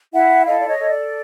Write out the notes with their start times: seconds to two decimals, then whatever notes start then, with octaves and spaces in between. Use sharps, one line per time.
0.12 E4 E5 F#5
0.46 A4 D#5 F5
0.60 D5
0.67 C#5 D#5
0.79 A4
0.89 D5